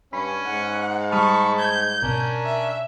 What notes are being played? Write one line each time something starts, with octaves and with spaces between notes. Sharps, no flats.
G2 C#4 B5
G#2 F#5
G3 A5 B5 C#6 D#6 F6
G6 G#6
G#1 B2 C#4 D4 A#4 A#5
E5